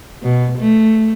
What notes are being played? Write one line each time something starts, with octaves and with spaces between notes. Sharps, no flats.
B2
A3